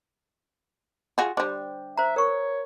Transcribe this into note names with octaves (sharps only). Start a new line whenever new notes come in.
F4 F#4 G#4
D3 G3 C5 D6
C5 E5 A#5
A#4 C#5 C#6